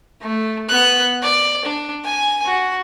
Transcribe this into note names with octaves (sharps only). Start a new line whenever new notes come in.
A3
B3 F#6
D5
D4
G#5
F#4